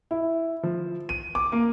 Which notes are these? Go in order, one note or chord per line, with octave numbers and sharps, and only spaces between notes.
E4
F3
D#7
D6
A#3